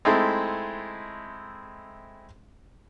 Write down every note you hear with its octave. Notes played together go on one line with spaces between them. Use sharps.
G#3 A3 C4 D#4 E4 A4